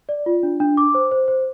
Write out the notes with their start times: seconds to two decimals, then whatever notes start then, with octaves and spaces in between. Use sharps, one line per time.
0.09 D5
0.26 F4
0.43 D4
0.60 D4
0.77 D6
0.95 C5
1.12 C5
1.28 C5